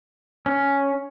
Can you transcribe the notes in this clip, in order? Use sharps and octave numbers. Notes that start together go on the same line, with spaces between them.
C#4